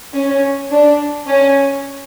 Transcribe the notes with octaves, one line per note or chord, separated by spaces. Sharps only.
C#4
D4
C#4